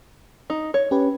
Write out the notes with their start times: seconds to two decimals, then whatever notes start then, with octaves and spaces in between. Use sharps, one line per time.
0.50 D#4
0.74 C#5
0.91 C#4 G4 B4